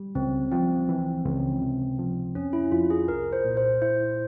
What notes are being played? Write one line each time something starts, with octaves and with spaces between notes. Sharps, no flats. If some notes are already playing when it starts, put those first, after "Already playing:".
Already playing: G3
C#2 C4
F3 C4
E3
C#2
C3
F3
F2 C#4
E4
F2 F4
G#4
C2 A#4
C5
A#2
C5
E4 C5